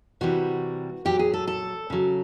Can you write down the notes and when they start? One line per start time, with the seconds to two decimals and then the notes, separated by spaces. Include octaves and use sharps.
0.21 C3 E3 G3 F#4
1.05 A#2 F#3 G4
1.19 G#4
1.34 A4
1.47 A4
1.90 C#3 F#3